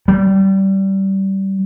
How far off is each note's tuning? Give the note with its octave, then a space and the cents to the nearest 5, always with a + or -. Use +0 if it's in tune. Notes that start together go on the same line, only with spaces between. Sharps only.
G3 -20